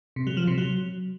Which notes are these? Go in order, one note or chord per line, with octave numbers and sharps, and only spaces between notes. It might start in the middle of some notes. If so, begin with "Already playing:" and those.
C3
F#3
F3
C3
F#3